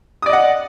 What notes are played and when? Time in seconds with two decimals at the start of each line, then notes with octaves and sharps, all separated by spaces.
0.22 D#6
0.26 D5
0.30 D#5
0.33 F#5